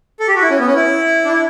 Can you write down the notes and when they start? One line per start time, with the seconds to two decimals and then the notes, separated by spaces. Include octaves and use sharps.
0.20 A4
0.28 G4
0.36 F#4
0.42 E4
0.50 C#4
0.59 B3
0.67 C#4
0.75 E4
1.25 D4
1.32 E4